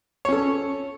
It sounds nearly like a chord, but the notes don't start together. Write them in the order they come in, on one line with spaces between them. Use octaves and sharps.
C#5 C#4 A4